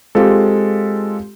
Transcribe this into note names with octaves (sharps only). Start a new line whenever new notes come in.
G#3 C4 F4 G4 A4